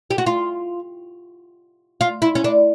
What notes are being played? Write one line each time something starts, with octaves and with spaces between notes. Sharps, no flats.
G4
F#4
F4
F4
E4
C#4
D4